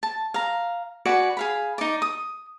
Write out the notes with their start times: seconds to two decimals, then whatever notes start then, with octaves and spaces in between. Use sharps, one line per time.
0.03 A5
0.34 F5 A#5
1.05 F#4 B4 D5 G#5
1.37 G#4 F5 B5
1.78 D#4 D5
2.02 D#6